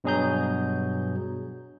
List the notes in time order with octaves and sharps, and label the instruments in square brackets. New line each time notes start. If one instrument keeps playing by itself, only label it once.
[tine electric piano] G2 B2 F#3 G#4 A#5 G6